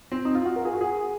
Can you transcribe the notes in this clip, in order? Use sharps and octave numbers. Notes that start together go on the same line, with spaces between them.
C4
D#4
F4
F#4
A#4
G#4
F#4
G#4